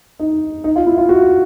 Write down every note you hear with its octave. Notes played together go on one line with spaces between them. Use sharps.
D#4
D#4
F4
E4
F4
F#4